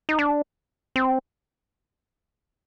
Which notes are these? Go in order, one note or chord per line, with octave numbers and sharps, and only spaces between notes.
D#4
D4
C4